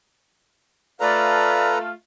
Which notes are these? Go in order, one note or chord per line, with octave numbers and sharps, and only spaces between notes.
A3 F4 A4 B4 D5 F5 A#5